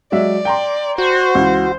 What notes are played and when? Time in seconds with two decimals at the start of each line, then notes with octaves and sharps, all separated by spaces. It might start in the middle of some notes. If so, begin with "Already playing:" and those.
0.12 F#3 G#3 D5 E5
0.45 G5 A#5 C6
0.98 F#4 C5
1.35 C#2 E3